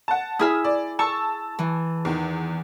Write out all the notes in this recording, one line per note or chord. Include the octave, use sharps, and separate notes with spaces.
F#5 A5
E4 G#4 E5 D#6 F6
D5
A5 C#6 E6
E3
E2 D#3